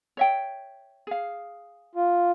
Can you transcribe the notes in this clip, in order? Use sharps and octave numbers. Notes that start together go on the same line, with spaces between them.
C#5 E5 G5
G#4 F5
F4